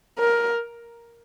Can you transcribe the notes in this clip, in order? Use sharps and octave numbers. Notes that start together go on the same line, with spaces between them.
A#4